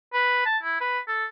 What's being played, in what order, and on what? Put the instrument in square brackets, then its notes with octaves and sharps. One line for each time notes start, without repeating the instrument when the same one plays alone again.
[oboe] B4
A5
E4
B4
A4